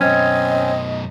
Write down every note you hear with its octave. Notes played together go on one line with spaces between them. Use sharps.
F#2 B2 C4 C#4 D#5